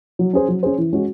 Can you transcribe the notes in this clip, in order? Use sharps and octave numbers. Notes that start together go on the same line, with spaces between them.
F#3
C#4 G#4 C5
F#3
C#4 G#4 C5
E3
G#3 C#4 F#4